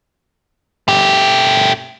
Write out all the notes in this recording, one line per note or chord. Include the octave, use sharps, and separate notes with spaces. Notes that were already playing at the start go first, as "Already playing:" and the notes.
A3 G4